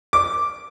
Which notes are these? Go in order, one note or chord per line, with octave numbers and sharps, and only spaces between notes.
D6